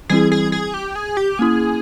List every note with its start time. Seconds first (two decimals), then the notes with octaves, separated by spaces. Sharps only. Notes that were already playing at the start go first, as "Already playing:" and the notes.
0.09 E3 G3 C4 E4 G#4
0.32 G#4
0.52 G#4
0.74 G4
0.96 G#4
1.17 G4
1.39 A#3 C#4 E4 G#4